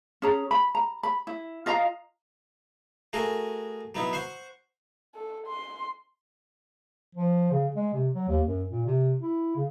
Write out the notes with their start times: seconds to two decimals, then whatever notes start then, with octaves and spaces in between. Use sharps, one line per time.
0.22 C#4 G#4 A#5
0.51 B5
0.75 A#5
1.03 B5
1.27 E4
1.66 F4 D#5 F5 A#5
3.13 A3 F#4 G#4 A#4
3.95 F#3 B3 D#4 E4
4.13 C5 F#5 C6 C#6
5.15 A4
5.47 C6
7.15 F3
7.51 C#3
7.76 G#3
7.94 C3
8.15 F#3
8.28 D#2
8.47 F#2
8.70 A#2
8.87 C3
9.22 E4
9.56 C#3